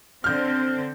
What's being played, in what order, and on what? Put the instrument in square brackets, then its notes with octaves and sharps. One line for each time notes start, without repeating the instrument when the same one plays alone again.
[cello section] D3 C4 [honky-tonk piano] F6 G6